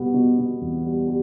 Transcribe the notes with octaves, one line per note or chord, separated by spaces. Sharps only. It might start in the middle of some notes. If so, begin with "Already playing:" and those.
Already playing: B2 G3 B3
B2
B2
E2
G3
G3